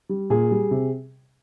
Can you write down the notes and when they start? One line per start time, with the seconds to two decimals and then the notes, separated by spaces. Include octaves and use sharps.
0.09 G3
0.30 A#2 G#4
0.51 G3
0.71 C3